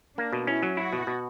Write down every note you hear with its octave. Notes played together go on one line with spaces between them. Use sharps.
A#3 D4
B2
C#4 E4
F#3
E4 F#4
B2
B2